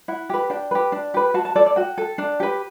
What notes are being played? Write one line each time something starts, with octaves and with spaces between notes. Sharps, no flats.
E4 F#5
G4 B4
D4 G5
G4 B4
D4
G4 B4
F#4 A5
A5
A4 D5
D5
F#4 G5
A4
D4
G4 B4